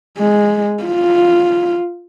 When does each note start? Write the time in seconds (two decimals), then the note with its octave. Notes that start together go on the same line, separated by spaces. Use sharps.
0.18 G#3
0.84 F4